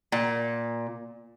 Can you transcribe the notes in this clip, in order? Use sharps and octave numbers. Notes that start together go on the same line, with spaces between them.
A#2